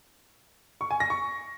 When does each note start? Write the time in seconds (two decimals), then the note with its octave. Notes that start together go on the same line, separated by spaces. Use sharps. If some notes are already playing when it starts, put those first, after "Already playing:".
0.81 C#6
0.91 G#5
1.00 A#6
1.10 C#6